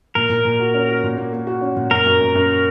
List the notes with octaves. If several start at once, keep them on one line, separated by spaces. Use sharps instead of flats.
A#2 A#4
A#2
A#2
F#4
C#4
F#4
A#2
A#3
A#3
F#4
C#4
A#2
F#2 A#4
F#2
F#2
F#2